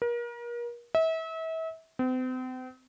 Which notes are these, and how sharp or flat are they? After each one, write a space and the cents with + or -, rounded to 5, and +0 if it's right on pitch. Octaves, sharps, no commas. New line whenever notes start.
A#4 +35
E5 -35
C4 -40